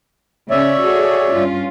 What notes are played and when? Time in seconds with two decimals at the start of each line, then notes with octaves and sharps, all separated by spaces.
0.50 C#3 C#4 C#5 D5 E5
0.84 F#4 G#4 A4
1.31 G2 C#4 F4